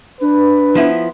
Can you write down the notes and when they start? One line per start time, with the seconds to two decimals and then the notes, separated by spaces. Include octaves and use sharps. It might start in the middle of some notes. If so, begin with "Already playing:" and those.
0.21 D4 B4
0.75 F3 B3 E4